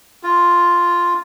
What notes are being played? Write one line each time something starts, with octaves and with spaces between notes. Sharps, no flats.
F4